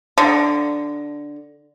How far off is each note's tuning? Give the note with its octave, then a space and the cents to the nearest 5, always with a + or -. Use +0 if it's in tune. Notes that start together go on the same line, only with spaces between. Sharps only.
D3 +0 A#5 +20